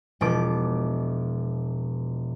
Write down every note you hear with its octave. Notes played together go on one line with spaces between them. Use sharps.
E1 B2 F3 D6